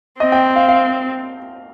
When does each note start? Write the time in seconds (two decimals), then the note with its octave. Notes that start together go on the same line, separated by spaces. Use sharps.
0.20 C4 D#5
0.32 G5
0.56 F5
0.69 F5